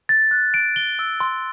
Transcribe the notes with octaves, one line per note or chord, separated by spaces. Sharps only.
A6
F#6
D7
G7
E6
C6